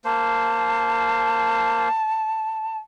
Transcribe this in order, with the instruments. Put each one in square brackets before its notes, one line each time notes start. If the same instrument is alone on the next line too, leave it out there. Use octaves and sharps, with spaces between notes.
[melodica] A#3 C5 [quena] A5